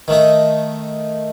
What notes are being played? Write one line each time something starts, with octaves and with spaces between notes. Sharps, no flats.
D#3 A3 D#4